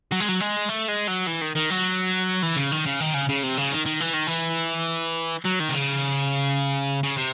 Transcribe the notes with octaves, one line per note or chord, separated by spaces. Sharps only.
F#3
G#3
F#3
G#3
A3
G#3
F#3
E3
D#3
D#3
F#3
E3
C#3
D#3
C#3
D#3
C#3
C#3
C3
C#3
D#3
D#3
E3
D#3
E3
F#3
D#3
C3
C#3
C#3
C3